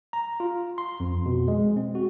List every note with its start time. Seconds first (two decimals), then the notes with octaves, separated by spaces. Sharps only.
0.13 A#5
0.40 F4
0.78 C6
1.00 F2
1.26 B2
1.48 G#3
1.77 C4
1.95 F#4